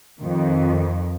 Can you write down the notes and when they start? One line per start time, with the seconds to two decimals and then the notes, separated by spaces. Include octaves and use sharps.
0.20 F2 D#3